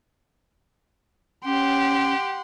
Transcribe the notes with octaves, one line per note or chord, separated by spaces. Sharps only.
C#4 G4 F#5 C6